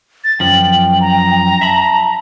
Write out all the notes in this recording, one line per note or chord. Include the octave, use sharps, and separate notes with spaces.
A6
F#2 F3 G5 F#7
A#5
E5 A5 B5